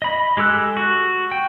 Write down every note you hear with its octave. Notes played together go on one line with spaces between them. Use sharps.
D#5 B5
G#3 G4 A4 E6 F#6
F#4
G5